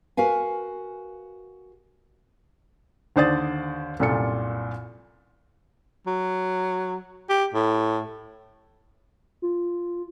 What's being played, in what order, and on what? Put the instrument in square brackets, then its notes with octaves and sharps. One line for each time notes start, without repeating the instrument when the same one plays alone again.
[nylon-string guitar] F#4 A#4 B4 F5 G#5
[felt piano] D#2 D3 C5 D5 D#6 A6
C2 F#2 A#2 F4 A4 C#7
[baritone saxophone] F#3
G4
A2
[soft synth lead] F4